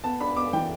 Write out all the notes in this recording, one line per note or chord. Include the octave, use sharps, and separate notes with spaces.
B3 A5
D4 B5
B3 D6
E3 G5